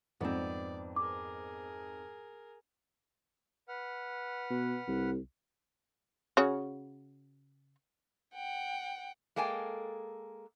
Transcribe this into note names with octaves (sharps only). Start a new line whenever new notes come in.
F2 G#2 B3 C4 D5
G#4 A#4 D6
B4 F#5 F6
B2
C2
C#3 F#4 C#5
F#5 G5
G#3 A#3 A4 G5 G#5